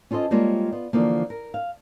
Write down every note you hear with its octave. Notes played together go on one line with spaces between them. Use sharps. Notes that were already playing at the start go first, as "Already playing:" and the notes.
C#4 F4 A4 C5 D#5
G3 G#3 A#3 C4 F4 C#5
B3 F4
D3 E3 F3 A#3
A#4
F5